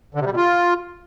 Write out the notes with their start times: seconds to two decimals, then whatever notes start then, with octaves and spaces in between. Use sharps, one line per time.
0.14 D3
0.20 C3
0.25 G3
0.31 B2
0.37 F4